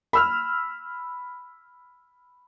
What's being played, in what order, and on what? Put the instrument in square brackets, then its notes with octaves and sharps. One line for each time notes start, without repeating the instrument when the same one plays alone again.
[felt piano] B5 E6 F6